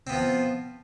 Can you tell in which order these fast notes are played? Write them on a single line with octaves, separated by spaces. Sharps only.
C4 B3 F4 F3